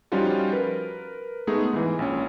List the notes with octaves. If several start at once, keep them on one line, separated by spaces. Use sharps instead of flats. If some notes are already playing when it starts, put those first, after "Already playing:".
F3 G3 C#4 D#4 F4 F#4
A#4 B4
G#3 A3 B3 D#4 G#4
G#2 E3
A#1 C#4